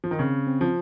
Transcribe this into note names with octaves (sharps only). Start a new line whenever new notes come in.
F3
D#3
C#3 C4
C4
F3